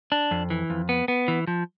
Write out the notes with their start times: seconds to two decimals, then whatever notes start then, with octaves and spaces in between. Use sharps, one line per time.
0.12 D4
0.31 F2
0.50 E3
0.70 F2
0.89 B3
1.08 B3
1.28 E3
1.47 F3